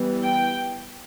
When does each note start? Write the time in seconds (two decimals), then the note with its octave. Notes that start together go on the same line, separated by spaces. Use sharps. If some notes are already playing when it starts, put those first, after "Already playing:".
Already playing: E3 G3 B3
0.23 G5